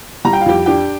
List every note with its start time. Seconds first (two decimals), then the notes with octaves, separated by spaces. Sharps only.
0.25 G3 A#5
0.33 G5
0.41 F5
0.46 F2 G4 G5
0.66 D4 G4 G5